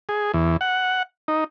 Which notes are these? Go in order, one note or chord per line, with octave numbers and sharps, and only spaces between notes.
G#4
E2
F#5
D#4